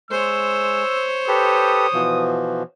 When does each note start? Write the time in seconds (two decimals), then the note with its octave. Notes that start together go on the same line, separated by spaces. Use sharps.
0.11 G#3 C5 C#5 E6
1.28 G4 A4 B4 D#6
1.94 B2 E3 F3